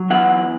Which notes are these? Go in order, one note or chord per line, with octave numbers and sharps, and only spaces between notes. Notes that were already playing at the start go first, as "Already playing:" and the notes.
Already playing: F#3
E2 F#5